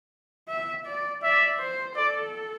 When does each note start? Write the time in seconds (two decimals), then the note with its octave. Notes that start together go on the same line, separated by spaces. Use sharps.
0.49 E5
0.86 D5
1.23 D5 E5
1.60 C5
1.96 A4 D5